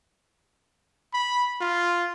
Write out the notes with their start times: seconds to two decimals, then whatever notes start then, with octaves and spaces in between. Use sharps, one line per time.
1.13 B5
1.61 F4